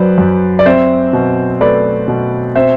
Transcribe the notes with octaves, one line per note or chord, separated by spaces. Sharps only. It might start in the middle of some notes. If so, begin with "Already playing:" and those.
Already playing: F#2 F#3 B4 C5 D5
F#2
D5
C4 C5 E5
B2
A3 B4 D5
B2
C4 C5 E5